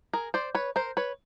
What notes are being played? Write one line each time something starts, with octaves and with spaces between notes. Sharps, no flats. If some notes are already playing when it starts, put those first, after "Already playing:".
G#4 A#4
C5 D5
B4 C#5
A#4 C5
B4 C#5